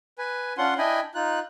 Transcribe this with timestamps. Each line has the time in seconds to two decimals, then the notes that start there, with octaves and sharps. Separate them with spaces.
0.18 B4 G#5
0.58 C#4 D4 F4 F#5 C6
0.78 D4 E4 D#5 G5 G#5 B5
1.14 D#4 F4 F#6